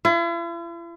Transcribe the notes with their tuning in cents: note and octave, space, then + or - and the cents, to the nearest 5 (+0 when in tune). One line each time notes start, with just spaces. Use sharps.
E4 +45